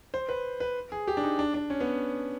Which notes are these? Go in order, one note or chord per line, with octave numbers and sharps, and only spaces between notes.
C5
B4
B4
G#4
G4
D4
D#4
D4
D4
C#4
B3